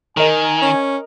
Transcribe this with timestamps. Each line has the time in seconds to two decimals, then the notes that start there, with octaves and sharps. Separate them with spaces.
0.17 D#3 A#4 D#5 G#5
0.62 C#4